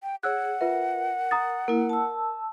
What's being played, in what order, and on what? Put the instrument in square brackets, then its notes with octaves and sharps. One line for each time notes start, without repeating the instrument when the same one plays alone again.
[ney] G5
[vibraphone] G#4 [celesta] C#5 E6 F#6 [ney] F#5
[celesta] F4 B4 E5 [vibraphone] A#4
[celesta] A#5 D#6 A6
[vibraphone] A#3 E4 [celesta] A#4
[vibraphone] A5 E6